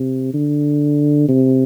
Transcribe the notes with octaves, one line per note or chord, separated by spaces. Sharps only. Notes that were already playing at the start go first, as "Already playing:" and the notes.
Already playing: C3
D3
C3